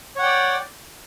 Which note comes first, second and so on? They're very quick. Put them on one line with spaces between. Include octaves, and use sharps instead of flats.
C#5 F#5 G5 D5